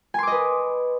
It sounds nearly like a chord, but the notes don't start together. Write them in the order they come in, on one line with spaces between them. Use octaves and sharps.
G#5 C6 D6 D#5 B4